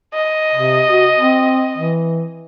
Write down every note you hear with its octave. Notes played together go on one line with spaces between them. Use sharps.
D#5
C3
F#4
C4
E3